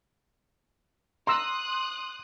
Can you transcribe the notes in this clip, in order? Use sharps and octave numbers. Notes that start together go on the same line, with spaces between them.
A#5 C6 D#6 E6 F#6